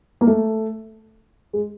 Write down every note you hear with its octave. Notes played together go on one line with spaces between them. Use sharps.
A#3
A3
G#3